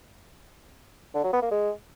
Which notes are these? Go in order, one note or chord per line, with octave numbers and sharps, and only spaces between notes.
D3
F#3
B3
A#3
G#3